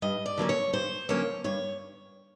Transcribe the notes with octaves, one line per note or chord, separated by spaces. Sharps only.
G2 D#5
D5
D3 F#3 A#3 C#4
C#5
G2 C5
D3 F#3 A#3 C#4 C#5
G2 C#5